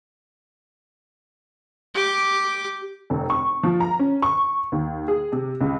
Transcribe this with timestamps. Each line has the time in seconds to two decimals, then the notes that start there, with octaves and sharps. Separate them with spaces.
1.94 G4 D6
3.10 F1
3.30 C#6
3.63 F3
3.80 A#5
3.99 C#4
4.22 C#6
4.72 D#2
5.08 G#4
5.32 C3
5.61 C#2